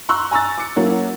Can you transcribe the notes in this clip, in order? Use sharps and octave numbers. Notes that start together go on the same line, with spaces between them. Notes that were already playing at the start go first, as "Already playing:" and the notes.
A#5 C6 C#6 E6 F#6
G#5 A#5 C#6 E6 A6
D6 C#7
F#3 A#3 C#4 E4